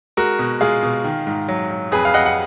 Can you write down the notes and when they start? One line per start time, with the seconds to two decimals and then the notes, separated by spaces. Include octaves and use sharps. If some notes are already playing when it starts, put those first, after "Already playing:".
0.17 G#3 F#4 A#4
0.39 B2
0.61 G#3 F4 G#4
0.83 B2
1.04 D#3
1.27 G#2
1.48 F#3
1.71 F#3
1.92 F2 G#4 B4
2.05 F5
2.14 F2 D#5 F#5
2.26 F#5